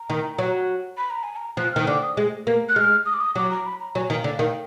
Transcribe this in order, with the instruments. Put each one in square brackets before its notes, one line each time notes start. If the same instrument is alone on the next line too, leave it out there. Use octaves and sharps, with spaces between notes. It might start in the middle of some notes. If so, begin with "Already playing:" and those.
Already playing: [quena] A#5
[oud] D#3
F#3
[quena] B5
A#5
G#5
A#5
[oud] F3 [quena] F#6
[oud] D#3 [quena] F6
[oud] D3 [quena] D6
[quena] D#6
[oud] G#3
A#3
[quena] F#6
[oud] G#3 [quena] F6
[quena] D#6
D6
D#6
[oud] F#3 [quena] D6
[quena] A#5
B5
A#5
[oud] F#3 [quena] G#5
[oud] D#3
[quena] F5
[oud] D3
[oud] D#3 [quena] F5